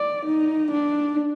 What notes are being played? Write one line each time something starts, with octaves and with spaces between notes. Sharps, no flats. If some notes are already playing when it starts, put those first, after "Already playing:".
Already playing: D5
D#4
D4